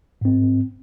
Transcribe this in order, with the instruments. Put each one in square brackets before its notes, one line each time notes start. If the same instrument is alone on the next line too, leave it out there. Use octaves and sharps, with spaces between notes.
[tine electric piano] G#2 C4